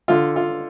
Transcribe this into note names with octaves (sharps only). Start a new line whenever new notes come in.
D3 F4
F4